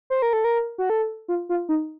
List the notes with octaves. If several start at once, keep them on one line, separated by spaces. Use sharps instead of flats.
C5
A#4
A4
A#4
F#4
A4
F4
F4
D#4